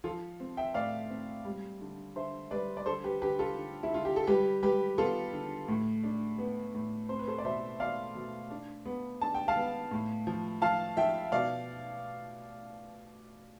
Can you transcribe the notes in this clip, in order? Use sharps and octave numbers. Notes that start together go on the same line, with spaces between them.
F3 F4 A4
C4
E5 G5
A2 D5 F5
C4
G3
D3
D3 C5 E5
G3 B4 D5
D5
D3 A4 C5
G4 B4
D3 G4 B4
F4 A4
D3
E4
D3 F4
G4
A4
G3 G4 B4
G3 G4 B4
B3 F4 A4
D3
A2
D4
B3
A2
C4 C5
B4
A4 C5
D5
B2 C5 E5
B2 D5 F5
B2
D4
B3
D4 A5
G5
F5 A5
B3
A2
F3
F3 F5 A5
F3 E5 G5
B2 D5 F5